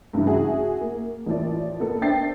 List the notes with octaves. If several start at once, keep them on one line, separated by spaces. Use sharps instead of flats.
G2 C#3 E3
E4 F#4 G#4
A#3
A1 E3 F3 D5
A#3 B3 A4
D4 C5 E5 G5 A6 C7